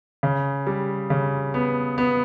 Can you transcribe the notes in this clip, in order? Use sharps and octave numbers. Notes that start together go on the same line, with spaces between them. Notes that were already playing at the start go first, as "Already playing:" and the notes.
C#3
G3
C#3
B3
B3